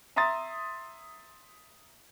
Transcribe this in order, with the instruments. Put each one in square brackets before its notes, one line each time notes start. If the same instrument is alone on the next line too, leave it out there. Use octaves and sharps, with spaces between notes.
[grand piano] E5 A#5 C6 D#6 A6